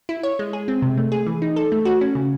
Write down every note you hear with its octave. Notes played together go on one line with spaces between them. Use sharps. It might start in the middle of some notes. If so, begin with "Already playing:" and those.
E4
C#5
G#3
G#4
C4
C3
A3
G#4
E3
D#4
A4
A3
F#4
C#4
C#3